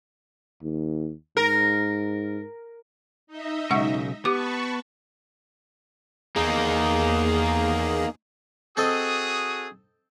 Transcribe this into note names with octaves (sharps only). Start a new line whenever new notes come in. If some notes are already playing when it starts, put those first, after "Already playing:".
D#2
G#2 A#4
D#4 D#5 E5
B1 C#3 G#3 F#5 C#6
B3 G4 A5 B5 C#6 D6
E2 A#3 D#4 G#4
C4 F#4 G#4 A4 D#5 D#6